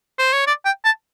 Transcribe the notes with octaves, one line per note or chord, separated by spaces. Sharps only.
C5
C#5
D5
G5
A5